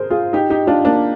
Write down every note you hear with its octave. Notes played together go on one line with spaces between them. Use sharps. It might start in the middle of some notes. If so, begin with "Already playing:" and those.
Already playing: G#4 A#4 C5
F4 G#4
D#4 G4
D#4 G4
D4 F4
A#3 D4